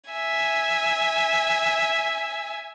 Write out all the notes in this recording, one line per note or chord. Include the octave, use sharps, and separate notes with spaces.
E5 G#5